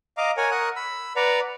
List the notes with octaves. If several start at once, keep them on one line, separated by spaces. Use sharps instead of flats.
D#5 F5 A#5 D6
A#4 C#5 F#5 G#5
A#4 F#5 C#6 D#6 F#6
B5 E6
B4 D5 F#5 A#5